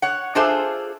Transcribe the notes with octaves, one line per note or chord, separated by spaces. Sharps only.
C#5 F#5
D4 F4 G#4 A4 C5 E5